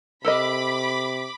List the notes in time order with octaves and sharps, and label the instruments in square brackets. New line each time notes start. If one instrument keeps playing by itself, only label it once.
[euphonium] C3 [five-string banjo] A4 A#4 D#5 [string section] B5 D6